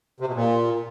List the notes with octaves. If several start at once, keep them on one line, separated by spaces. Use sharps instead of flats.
C3
B2
A#2